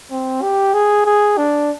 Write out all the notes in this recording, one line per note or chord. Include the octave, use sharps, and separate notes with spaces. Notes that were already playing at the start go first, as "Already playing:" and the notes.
C4
G4
G#4
G#4
D4